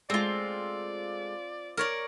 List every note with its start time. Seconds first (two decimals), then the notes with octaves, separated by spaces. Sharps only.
0.10 G#3 A3 C4 F4 D5
1.77 A#4 C#5 D5